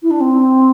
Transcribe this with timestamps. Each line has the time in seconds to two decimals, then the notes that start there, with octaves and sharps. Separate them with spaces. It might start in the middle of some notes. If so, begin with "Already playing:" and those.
0.02 E4
0.10 D4
0.20 C4